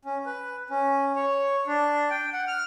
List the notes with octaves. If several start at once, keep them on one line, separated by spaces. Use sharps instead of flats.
C#4
B4
C#4
C#5
D4
G5
F#5
F6